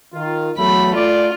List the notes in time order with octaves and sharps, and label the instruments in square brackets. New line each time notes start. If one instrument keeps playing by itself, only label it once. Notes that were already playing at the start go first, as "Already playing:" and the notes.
[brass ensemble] D#3 F4
[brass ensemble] E2 F#3 A3 [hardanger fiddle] B5
[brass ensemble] A3 D5 [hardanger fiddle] F4